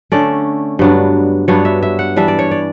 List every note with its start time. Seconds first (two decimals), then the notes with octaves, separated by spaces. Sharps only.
0.12 D3 A3 C#4 D5
0.79 G2 F#3 B3 D4
1.48 G2 F#3 B3 D4 C#5
1.65 E5
1.83 E5
1.99 F#5
2.16 E3 G3 D4 E5
2.28 D5
2.39 C#5
2.51 D5